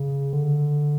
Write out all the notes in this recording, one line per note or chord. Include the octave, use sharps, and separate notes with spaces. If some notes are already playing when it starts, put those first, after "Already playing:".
Already playing: C#3
D3